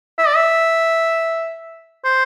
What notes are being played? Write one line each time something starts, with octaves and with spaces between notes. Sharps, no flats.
E5
D5
E5
C5